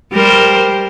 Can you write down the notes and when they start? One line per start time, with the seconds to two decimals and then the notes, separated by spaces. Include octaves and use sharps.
0.13 G3 A#4 C5